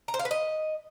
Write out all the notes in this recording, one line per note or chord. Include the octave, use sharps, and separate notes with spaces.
A#5
C5
F5
B4
D#5